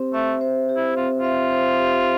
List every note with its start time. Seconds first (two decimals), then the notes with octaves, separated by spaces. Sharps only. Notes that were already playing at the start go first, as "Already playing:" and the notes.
Already playing: C4 G4 C5
0.14 A3 E5
0.41 C5
0.69 G4
0.76 E4
0.97 C4 F4
1.19 F4 E5
1.52 C5
1.80 G4